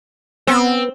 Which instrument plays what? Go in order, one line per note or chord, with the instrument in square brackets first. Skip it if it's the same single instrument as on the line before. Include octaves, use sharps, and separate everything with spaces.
[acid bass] B3 [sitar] C4